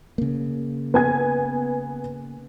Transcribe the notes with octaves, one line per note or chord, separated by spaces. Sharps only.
C#3 A#3
B3 G#5 G#6